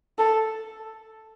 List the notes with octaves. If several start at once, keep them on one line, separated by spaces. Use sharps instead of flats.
A4